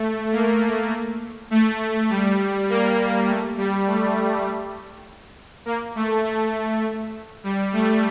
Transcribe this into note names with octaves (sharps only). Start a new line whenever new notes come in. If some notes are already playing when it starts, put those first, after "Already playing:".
Already playing: A3
A#3
A3
G3
A#3
A3
G3
A3
A#3
A3
A3
G3
A3